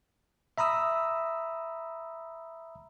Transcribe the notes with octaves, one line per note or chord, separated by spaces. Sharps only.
E5 A#5 B5 D#6 E6